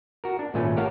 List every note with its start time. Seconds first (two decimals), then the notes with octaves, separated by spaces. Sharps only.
0.24 F#4 A#4
0.39 D4
0.54 G#1 A#2 A3 C#4 B4
0.77 G4 A#4 C#5 F5 F#5 A5